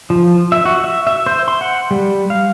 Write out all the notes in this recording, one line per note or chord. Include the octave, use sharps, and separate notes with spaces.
F3
E5
F#4
E5
E5
C5
C6
F#5
G3
F5